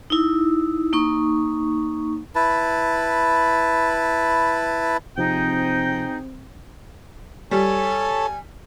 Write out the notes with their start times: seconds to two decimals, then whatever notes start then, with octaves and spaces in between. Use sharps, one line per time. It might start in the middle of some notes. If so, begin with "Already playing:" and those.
0.10 D#4 E4
0.93 A#3 D#4 C#6
2.35 E4 B4 A5
5.18 C3 F3 C4 D#4 G#4 G5
7.51 G3 A4 C#5 G#5 A5